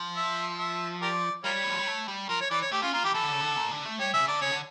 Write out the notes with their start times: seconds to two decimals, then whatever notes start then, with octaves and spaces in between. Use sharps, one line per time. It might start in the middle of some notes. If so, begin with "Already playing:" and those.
Already playing: F3
0.17 E5
0.59 E5
1.02 G4 A#4 D5
1.44 G3 F4 A#4 C#5
1.64 E3
1.71 F3
1.79 G3
1.87 A3
2.08 G3
2.29 F3 A#4
2.41 C#5
2.51 E3 D5
2.62 C#5
2.71 A3 G4
2.82 C#4 F4
2.93 A#3 F4
3.04 E3 G4
3.14 E3 A4
3.23 D3
3.32 C#3
3.40 D3
3.56 A#2
3.71 D3
3.85 A3
3.99 G3 C#5
4.13 C#3 E5
4.28 D3 D5
4.41 C#3 C#5
4.51 D3